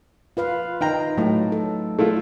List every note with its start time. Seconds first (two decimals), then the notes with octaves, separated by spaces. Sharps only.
0.37 F4 B4 F5
0.81 D#4 F5 G5 A#5
1.17 A2 F#3 A3
1.52 A4
1.99 A3 E4 F4